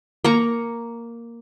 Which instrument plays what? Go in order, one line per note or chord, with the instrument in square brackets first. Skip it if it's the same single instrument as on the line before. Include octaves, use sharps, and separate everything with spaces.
[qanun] A#3 A#5 C#6